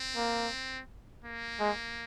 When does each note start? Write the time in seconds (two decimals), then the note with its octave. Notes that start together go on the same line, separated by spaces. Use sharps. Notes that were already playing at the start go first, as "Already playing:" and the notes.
Already playing: C4
0.16 A#3
1.24 A#3
1.60 G#3